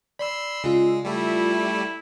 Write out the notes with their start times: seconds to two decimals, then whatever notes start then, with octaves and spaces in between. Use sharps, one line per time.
0.19 D5 B5 C6 E6
0.64 C#3 G#3 F4 E6
1.05 G3 A3 E4